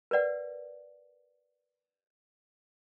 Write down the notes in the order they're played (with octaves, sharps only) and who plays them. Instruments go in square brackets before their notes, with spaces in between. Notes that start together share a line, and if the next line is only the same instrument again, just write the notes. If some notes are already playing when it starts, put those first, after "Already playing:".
[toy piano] A#4 B4 D5 F#5